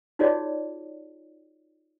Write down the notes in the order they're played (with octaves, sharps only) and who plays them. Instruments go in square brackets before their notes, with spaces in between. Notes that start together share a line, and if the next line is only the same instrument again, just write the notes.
[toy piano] D#4 F4 F#4 G#4 C#5 D5